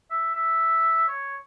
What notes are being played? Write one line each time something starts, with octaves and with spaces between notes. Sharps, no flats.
E5
E5
C#5